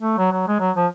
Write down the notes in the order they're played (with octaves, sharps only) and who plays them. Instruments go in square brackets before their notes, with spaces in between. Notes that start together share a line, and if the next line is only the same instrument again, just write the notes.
[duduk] A3
F#3
F#3
G#3
F#3
F3